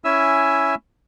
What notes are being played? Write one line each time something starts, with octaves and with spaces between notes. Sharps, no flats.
C#4 E4 E5 G#5 E6